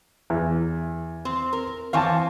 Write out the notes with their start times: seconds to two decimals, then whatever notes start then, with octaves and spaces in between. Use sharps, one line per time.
0.30 E2
1.25 C4
1.53 A#4
1.93 E3 C4 C#5 F5 G#5 A5